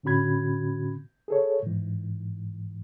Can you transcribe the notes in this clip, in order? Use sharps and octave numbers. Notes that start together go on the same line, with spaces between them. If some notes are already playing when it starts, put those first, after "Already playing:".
A2 D3 C#4 F#4 B5 G#6
G#4 A4 C#5
G#2 E3